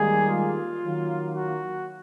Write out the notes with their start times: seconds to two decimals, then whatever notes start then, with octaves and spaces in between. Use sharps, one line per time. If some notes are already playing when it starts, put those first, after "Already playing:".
Already playing: D#3 G3 G#3 A#3 G#4
0.28 F4
0.81 D#3 F#3 A#3
1.33 F#4